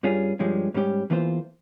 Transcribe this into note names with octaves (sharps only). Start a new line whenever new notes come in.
G2 G3 C#4 F4 G#4
G2 F3 G#3 C#4 G4
G#2 G3 C#4 G4
E2 E3 A#3 F4 C5